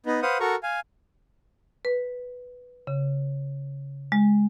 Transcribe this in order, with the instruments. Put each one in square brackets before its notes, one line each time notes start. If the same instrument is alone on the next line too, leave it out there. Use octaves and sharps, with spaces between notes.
[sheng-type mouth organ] B3 D#4
B4 C5 F5 F#5 D#6
F#4 A4 A#4 A#5 C#6
F5 G#5
[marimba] B4
C#3
G#3